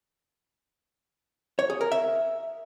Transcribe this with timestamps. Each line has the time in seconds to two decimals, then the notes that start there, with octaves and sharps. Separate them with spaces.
1.59 C#5
1.70 G#4
1.81 A#4
1.92 E5